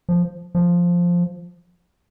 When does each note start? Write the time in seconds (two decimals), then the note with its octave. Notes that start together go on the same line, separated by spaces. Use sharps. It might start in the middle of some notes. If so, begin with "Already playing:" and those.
0.09 F3
0.55 F3